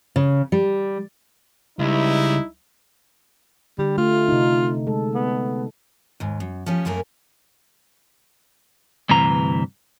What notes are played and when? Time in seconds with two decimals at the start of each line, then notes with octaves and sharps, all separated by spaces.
0.16 C#3
0.52 G3
1.79 C#2 G3 D#4 E4
3.78 D3 G3 G4
3.98 A3 F4
4.28 C3 D#4
4.87 G#3 A4
5.14 B3
6.20 D#2 G#2
6.40 F#2
6.66 F3 A3 C#4 G4 G#4
6.85 F#2 A3 A#3 G#4 A#4
9.09 D2 G2 C3 E3 A#5